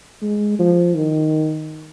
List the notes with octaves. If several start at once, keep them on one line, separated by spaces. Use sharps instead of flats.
G#3
F3
D#3